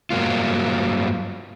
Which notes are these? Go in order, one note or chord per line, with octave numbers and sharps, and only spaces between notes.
G2 F#3 A#3 F4